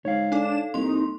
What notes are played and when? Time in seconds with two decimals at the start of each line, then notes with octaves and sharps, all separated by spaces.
0.05 G#2 C#5 F5
0.32 D4 D#4 A4 D5 E7
0.74 C2 A#3 D#4 C6